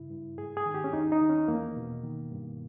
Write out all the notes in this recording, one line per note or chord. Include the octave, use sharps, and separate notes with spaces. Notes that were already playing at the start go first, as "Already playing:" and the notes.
Already playing: G2 C#3 E4
G2
G#2 G#4
G#4
D#3
G4
C#4
D#2 D#4
D#4
D#3
C#4
E2 A#3
B2
D#3
G2